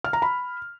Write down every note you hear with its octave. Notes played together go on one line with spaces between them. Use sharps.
F6
A#5
B5